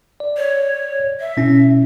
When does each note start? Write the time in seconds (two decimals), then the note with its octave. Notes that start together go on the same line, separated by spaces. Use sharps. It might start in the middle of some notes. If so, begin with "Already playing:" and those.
0.20 D5
0.37 C#5
1.20 E5
1.37 B2 C#4 E4